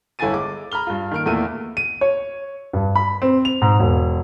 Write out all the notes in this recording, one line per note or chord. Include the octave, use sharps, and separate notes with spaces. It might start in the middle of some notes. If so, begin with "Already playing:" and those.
G1 E4 A4 G#5 A6 D#7
G#3 D6
A#5 B5 F6 G7
G2 F4
D#3 A#3 F6 D7
E2 A#2 A3 A#3 E4 D#7
D#7
C#5
G2
B5
C4
F7
G#2
E1